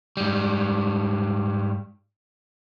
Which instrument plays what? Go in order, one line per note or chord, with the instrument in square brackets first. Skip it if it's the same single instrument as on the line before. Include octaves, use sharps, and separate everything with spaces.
[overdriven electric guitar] G#2 G3